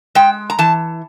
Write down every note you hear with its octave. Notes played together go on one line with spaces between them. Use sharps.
G#3 G5
A#5
E3 A5